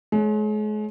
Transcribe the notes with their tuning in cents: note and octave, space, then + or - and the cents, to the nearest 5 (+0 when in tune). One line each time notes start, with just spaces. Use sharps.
G#3 +40 C#5 +0